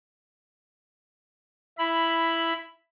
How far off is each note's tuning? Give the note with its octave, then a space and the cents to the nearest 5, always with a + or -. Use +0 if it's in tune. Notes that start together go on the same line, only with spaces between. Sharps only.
E4 +5 B5 +0